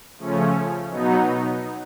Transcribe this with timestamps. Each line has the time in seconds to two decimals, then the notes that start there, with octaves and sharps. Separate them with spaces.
0.18 C#3 F3 A3 C#4
0.90 B2 F#3 B3 D#4